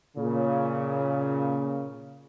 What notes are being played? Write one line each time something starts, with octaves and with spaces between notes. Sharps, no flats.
A#2 C#3